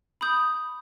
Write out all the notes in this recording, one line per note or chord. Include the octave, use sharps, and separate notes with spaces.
B5 D#6 G6